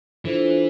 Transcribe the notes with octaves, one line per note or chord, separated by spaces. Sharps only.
E3 D4 F4 A4 C5